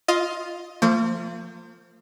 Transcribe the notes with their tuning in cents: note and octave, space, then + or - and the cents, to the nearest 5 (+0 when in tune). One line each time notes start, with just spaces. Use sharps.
F4 +0 D#5 +15
F3 +0 A#3 -45